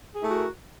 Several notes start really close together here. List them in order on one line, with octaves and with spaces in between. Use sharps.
G#4 E4 A3 F#4 A#4